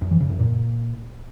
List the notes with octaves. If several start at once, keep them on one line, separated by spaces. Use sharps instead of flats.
F#2
E3
C#3
F#2
A#2